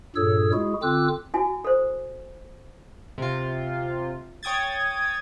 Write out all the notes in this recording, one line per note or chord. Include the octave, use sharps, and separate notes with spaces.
G2 A#2 G#4 A4 C#5 E6
G#3 E4 F#4 G#4
D3 C4 F4 D6 E6 F#6
E4 F#4 G#5
A4 C5
C3 F4
C#5 G5 D#6 G#6 A6